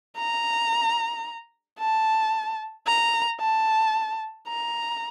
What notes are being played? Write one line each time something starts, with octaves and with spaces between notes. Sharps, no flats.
A#5
A5
A#5
A5
A#5